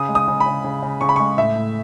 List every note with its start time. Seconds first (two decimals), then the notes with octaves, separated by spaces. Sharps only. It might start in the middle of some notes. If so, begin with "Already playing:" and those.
Already playing: C#3 D#6
0.09 G#3
0.15 D#6
0.28 C#3
0.40 B5
0.46 C#3
0.64 C#3
0.83 C#3
1.01 C#3 C#6
1.09 B5
1.16 G#3 C#6
1.37 A2 E5
1.56 A2